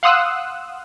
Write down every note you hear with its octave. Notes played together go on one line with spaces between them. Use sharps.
F5 F#5 C6 D#6 E6 F#6